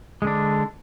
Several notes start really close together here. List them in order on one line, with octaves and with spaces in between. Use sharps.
G#3 D3 D4